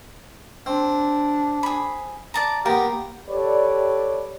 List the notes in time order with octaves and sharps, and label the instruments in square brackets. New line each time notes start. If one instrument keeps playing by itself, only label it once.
[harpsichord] C4 [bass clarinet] D4
[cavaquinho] G#4 B5
D5 A5 A#5
[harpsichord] A#3 B3 [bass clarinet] G4 [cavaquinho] A#4
[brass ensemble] G4 A4 B4 C#5 D5